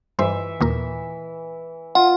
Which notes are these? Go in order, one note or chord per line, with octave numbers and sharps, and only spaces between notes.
G2 E3 C5 E5
D#2 A#2 A#4
F4 F#5